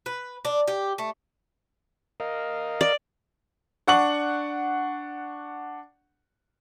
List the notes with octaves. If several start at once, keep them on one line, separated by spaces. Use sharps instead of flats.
B4
D4
G4
A3
A#4 D#5 F5
D5
D4 F#5 C#6 F#7